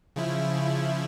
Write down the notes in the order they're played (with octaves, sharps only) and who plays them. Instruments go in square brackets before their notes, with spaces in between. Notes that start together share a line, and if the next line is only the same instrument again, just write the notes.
[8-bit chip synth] C#3 F3 E4